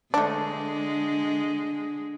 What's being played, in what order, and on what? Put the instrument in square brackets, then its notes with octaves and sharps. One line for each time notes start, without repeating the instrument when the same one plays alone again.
[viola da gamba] D3 G#3 [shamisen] A3 D4